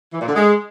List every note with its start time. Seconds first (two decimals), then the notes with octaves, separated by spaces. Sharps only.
0.13 E3
0.21 A#2
0.28 D3
0.36 G#3